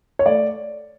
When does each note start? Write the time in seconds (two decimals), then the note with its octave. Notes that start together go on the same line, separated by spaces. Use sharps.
0.19 C#5
0.26 A3 D5